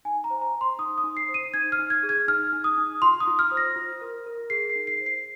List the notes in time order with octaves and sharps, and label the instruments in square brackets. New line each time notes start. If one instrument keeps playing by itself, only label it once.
[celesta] D#4 G#5
A#5
C5
A#5
C5
C6
D#4 D#6
D#6
D#4
C7
C5
D#7
D#4 G#6
F6
D#4
G#6
G#4
G#6
D#4 F6
D#4
D#6
D#4
F4 C6
D#6
F4
F6
C5
A#6
F4
A#4
A#4
G#4 C7
C7
D#4
C7
C5
C7